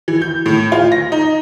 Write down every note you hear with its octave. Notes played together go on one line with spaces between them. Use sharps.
E3
G6
A2
F4
A#6
D#4